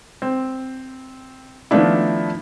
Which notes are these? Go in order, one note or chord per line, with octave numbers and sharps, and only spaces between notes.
C4
D#3 F3 A3 B3 D4 E4